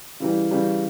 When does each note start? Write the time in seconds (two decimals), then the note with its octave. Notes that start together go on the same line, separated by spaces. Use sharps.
0.20 C#3 E3 G3
0.51 C#3 E3 G3